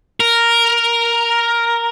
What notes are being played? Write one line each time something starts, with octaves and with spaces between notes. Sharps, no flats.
A#4